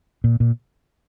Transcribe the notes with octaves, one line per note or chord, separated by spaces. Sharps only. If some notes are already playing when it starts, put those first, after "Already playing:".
A#2
A#2